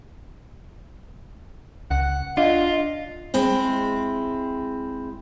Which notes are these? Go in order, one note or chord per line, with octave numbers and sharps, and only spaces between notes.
C#2 F#5
D4 F4 D#5
G#3 C4 E4